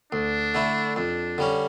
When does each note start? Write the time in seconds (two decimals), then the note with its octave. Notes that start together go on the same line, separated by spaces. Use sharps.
0.12 D2 D4
0.54 D3 A3 E4
0.96 F2 D4
1.38 D3 G3 C#4